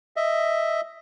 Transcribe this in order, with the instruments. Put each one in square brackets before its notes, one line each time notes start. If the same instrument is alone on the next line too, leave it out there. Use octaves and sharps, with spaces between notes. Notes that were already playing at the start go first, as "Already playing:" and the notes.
[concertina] D#5 E5